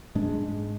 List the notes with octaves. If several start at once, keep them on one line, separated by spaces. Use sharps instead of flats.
G#2 G#3 D4